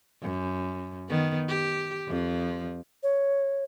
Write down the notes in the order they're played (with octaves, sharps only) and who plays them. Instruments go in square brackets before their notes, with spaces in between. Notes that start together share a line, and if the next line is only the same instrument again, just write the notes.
[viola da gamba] F#2
D#3 B3
G4
F2 F3
[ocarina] C#5